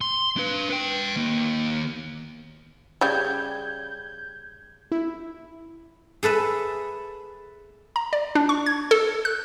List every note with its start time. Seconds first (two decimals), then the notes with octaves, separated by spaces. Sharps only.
0.01 C6
0.37 D4 B4
0.70 B4 G5
1.16 D#3 A#3
3.01 C#3 G3 G6 G#6
4.92 E4
6.23 G#4 A4 B4 E5
7.96 A#5
8.13 D5
8.35 D4
8.49 C#6
8.66 G#6
8.91 A4
9.25 F#6